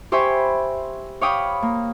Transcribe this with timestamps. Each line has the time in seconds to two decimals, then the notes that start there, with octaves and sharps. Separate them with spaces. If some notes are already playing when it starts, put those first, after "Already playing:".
0.12 G4 C5 E5 G#5 B5 C#6
1.21 C#5 F5 G5 B5 D6 D#6
1.62 A#3